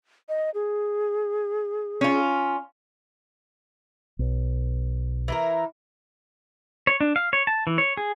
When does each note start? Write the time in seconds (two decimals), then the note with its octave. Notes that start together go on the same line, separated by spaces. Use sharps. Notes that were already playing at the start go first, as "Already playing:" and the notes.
0.29 D#5
0.54 G#4
2.01 C#4 F4
4.19 B1
5.28 E3 E4 A#4
6.87 C#5
7.01 D4
7.16 F5
7.33 C#5
7.47 A5
7.67 E3
7.78 C#5
7.97 G#4